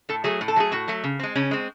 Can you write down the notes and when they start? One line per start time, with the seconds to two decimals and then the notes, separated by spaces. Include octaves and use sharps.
0.09 A2 A4
0.24 F#3 A3 G#4
0.41 A2
0.48 A4
0.56 F#3 A3 G#4
0.72 A2 F#4
0.88 F#3 A3
1.04 C#3
1.20 G#3 C4
1.36 C#3 C#4
1.51 G#3 C4